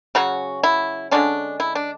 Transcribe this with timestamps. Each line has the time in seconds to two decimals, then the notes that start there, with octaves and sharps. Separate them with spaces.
0.15 C#3 F#3 C#4 F#4
0.63 E4
1.11 D3 G#3 C#4 D4
1.60 E4
1.75 D4